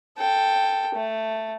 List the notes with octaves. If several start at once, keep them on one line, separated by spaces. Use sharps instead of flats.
A4 G5
A3